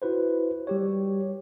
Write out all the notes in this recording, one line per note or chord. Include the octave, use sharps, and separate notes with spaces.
E4 F#4 B4 C5
G3 G4 C#5